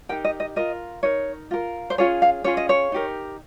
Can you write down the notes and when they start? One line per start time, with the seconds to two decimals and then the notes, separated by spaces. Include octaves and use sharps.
0.09 D#4 G4 A#4 G5
0.25 D#5
0.40 D#5
0.56 F4 A#4 D#5
1.03 D#4 A#4 C#5
1.51 F4 A#4
1.90 C5
1.98 C#4 F4 G#4 C#5
2.22 F5
2.44 C#4 F4 G#4 C#5
2.57 D#5
2.69 C#5
2.92 D#4 G4 A#4